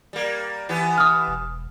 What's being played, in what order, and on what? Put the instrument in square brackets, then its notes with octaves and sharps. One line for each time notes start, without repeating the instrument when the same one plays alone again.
[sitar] G3 A#3
E3 B3 G4
[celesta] D#6 F6
[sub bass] E1